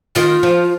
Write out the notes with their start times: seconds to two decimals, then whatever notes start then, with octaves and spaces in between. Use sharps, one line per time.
0.15 D#3 F4
0.43 F3